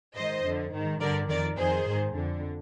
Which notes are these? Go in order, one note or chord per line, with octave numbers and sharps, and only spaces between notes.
G#2 D#3 C5 D#5
F2 D3
G#2 D#3
G2 D3 A#4 D5
F2 D#3 A#4 D5
F2 D#3 G#4 C5
G#2 D#3
F2 D3